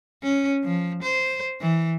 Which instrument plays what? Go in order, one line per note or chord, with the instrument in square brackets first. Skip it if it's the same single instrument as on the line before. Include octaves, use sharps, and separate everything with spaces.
[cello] C#4
F3
C5
E3